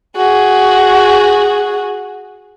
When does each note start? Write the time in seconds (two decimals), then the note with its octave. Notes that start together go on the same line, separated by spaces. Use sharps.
0.17 F#4 G#4